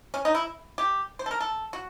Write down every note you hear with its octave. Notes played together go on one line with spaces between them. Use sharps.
C#4
D#4
E4
G4
C5
A4
A#4
A4
F#4